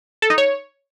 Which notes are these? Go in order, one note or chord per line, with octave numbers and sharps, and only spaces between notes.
A4
D#4
C#5